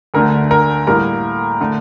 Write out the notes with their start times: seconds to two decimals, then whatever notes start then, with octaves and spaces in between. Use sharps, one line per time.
0.14 D2 D3 A3 A#4
0.51 A#4
0.87 A2 G3 A#3 A#4
1.61 D3 A3